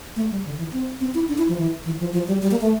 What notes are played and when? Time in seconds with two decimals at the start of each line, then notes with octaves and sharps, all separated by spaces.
0.16 A3
0.31 G3
0.45 D3
0.58 E3
0.73 C4
1.01 C4
1.14 E4
1.28 D4
1.38 E4
1.48 F3
1.58 E3
1.85 E3
2.00 F3
2.13 F3
2.27 G3
2.42 G3
2.51 A#3
2.61 A3